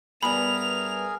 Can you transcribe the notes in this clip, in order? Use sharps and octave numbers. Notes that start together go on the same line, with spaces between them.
G2 B3 G#4 A#4 E5 G#5 B5 F7